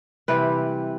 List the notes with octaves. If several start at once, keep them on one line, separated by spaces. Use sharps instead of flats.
C3 E3 G3 C4 G4 B4